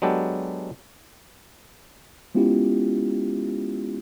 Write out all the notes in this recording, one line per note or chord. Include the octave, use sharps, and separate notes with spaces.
F#3 G#3 B3 D4 G4 A4
G#3 B3 C#4 E4 F4 G4